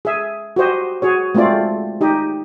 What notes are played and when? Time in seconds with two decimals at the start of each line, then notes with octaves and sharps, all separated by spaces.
0.05 G#4 E5
0.56 F#4 G4 C5 D#5
1.02 F#4 G#4 C#5
1.35 G#3 A3 C4 F4 D5
2.01 D#4 G4 D#5